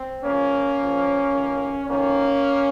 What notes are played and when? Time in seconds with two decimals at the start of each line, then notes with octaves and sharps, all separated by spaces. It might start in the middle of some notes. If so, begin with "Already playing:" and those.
Already playing: C4
0.23 C#2 C#3 F3 A#3 C#4
0.77 A#1 A#2 F3
1.32 C#2 C3 D#3
1.87 F2 D#3 A#3 C#4